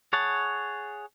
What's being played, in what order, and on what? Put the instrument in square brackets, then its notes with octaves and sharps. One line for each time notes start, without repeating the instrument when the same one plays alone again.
[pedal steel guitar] G#4 C#5 F#5 A5